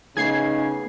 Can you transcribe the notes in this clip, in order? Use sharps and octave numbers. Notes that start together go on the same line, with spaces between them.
C#3 A3 B3 D#4 G#4 G#6 C7